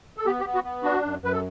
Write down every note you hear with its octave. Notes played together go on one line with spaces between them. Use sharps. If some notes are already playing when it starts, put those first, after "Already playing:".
A4
B3 G4
G4
B3
F#4
B3
D4 F#4
F#2
F#2 B4
A4